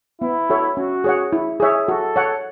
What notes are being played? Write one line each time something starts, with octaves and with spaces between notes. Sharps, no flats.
B3 E4
F#4 A4 C#5 E5
C#4 F#4
G#4 C#5 F#5
E4
G#4 C#5 E5
F#4 A4
C#5 F#5